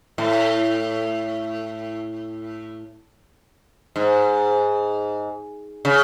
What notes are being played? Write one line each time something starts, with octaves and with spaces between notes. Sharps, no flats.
A2
G#2
C#3